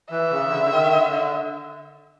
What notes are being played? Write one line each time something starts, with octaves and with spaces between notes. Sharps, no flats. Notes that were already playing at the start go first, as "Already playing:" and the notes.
E3 E5
C#3
D3
D3
D#3
D3
D3